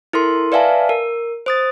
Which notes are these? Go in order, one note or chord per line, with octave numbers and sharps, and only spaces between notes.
E4 A4 A#4 C6
B4 D5 E5 F5 G#5 A5
A#4
C5 D#6 A6